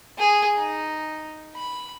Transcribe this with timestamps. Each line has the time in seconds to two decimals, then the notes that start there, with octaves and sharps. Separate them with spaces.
0.18 G#4
0.56 D#4
1.55 B5